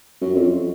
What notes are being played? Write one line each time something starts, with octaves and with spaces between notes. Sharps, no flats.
F#2
F2